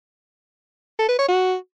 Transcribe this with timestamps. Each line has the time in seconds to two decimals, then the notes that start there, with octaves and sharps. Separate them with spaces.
0.99 A4
1.09 B4
1.19 C#5
1.28 F#4